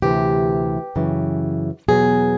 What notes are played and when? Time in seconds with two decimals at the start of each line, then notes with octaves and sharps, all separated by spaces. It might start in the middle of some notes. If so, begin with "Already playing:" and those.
0.02 D2 C3 E3 G4
0.96 F#2 C#3 E3
1.88 E2 B2 F#3 G#4